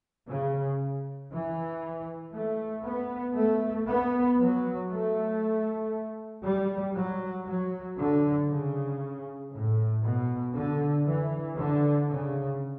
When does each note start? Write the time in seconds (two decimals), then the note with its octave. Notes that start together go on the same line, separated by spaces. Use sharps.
0.28 C#3
1.31 E3
2.33 A3
2.84 B3
3.36 A3
3.87 B3
4.40 F#3
4.90 A3
6.44 G3
6.96 F#3
7.46 F#3
7.98 D3
8.50 C#3
9.52 A2
10.03 B2
10.55 D3
11.06 E3
11.57 D3
12.09 C#3